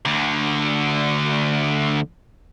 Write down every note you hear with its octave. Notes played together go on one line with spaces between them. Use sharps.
D2 D3